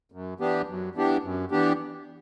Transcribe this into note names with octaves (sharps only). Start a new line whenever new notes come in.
F#2
E3 B3 D4 G4
F#2
E3 B3 D4 G4
F#2
E3 B3 D4 G4